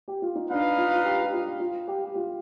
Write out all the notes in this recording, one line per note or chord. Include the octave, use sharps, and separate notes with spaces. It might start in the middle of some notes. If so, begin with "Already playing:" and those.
G4
F4
D#4
D4 D#4 B4 F5
F4
F4
G4
G4
F4
F4
G4
G4
F4